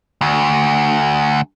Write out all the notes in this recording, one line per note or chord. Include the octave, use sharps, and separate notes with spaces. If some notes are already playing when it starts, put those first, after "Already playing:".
D2